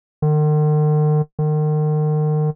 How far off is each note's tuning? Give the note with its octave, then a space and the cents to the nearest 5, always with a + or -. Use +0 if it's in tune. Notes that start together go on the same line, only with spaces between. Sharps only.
D#3 -45
D#3 -35